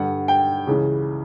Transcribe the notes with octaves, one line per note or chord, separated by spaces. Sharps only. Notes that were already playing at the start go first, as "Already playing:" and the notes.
Already playing: G2 D3 F#5
G5
C#2 C#3 E3